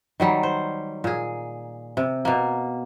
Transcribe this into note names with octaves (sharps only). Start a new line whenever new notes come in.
D#3 F#3 G3
C5
A#2 G#4
C3
B2 A#3